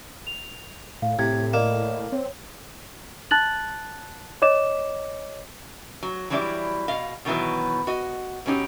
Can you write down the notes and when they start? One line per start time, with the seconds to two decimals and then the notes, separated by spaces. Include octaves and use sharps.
0.27 F7
1.02 A2 F5
1.19 A2 C3 G#6
1.53 A#3 D5 D#5 E7
2.12 C4 C#5
3.31 A5 F#6 A6 F#7
4.42 C#5 D#5 D6 E7
6.03 F#3
6.30 E3 F#3 G3 D4 E4 D5
6.88 B2 D#5 F5
7.25 B2 D#3 E3 F#3 B3
7.87 F#4 D#5
8.46 B2 F#3 C#4 D#4 G4